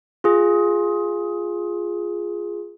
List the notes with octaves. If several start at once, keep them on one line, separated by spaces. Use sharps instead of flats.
F4 G#4